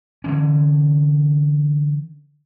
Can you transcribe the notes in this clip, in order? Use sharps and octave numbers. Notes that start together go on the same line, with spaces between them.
D3 E3 C#4